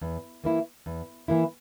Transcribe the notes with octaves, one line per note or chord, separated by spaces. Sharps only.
E2
E3 A#3 E4
E2
E3 A#3 E4